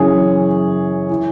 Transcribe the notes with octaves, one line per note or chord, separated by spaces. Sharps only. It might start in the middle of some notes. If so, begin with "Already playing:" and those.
Already playing: F#2 C#3 E3 G#4 C#5
E3